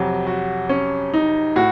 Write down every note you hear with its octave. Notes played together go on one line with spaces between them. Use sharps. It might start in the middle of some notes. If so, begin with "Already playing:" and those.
Already playing: F2 C3 F#3
F#4
C#4
D#4
A2 F#4